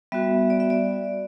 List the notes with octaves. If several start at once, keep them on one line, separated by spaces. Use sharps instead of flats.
G3 B3 F#4 E5
D5
E5
D5